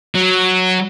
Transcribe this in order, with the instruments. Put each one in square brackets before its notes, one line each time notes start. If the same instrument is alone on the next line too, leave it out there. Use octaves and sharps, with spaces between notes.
[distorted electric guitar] F#3